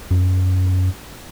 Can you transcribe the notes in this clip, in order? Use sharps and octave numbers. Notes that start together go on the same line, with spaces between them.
F#2